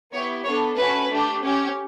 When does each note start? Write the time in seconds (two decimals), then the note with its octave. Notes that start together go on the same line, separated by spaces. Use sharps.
0.13 B3 E4 G4 C#5
0.45 B3 D4 A4 C#5
0.76 A3 C#4 F#4 B4
1.09 A3 D4 G4
1.41 C#4 G4